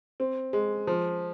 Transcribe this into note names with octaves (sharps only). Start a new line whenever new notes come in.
C4
G#3
F3